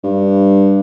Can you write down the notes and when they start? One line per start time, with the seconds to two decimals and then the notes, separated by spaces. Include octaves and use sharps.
0.03 G2